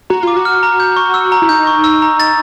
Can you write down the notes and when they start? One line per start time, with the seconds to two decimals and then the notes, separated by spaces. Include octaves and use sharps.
0.10 F#4 A#5
0.23 F4 D6
0.37 F#4
0.45 F6
0.63 A#5
0.80 G6
0.96 C#6
1.14 E6
1.32 A#5
1.42 E4
1.49 D#4 G6
1.67 C#6
1.84 E6
2.02 A#5
2.20 A6